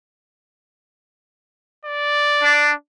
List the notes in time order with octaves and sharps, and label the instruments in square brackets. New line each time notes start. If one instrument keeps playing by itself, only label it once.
[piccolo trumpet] D5
[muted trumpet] D4